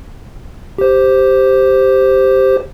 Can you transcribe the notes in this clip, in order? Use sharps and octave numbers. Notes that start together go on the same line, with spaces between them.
G4 C5